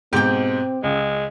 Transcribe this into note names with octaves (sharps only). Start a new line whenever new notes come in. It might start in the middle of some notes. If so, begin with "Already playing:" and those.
G#2 B2 C4 G4 G5
C#2 G#3